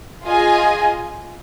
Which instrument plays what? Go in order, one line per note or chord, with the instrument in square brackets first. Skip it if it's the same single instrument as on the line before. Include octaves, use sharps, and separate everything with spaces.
[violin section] F4 G#4 D#5 G#5